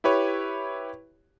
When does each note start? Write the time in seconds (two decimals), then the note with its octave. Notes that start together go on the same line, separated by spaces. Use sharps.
0.04 E4 G4 B4 C#5